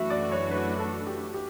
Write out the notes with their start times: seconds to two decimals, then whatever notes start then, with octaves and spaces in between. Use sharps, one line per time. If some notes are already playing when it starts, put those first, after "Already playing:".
Already playing: F#2 E3 A3 D4 F#4 E5
0.10 D5
0.31 C#5
0.51 B4
0.79 A4
1.07 G4
1.34 G4